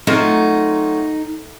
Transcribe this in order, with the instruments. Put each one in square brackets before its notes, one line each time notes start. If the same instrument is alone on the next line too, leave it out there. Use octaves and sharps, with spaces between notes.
[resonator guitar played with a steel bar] F#3 C4 F4 [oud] A3 [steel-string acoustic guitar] D#4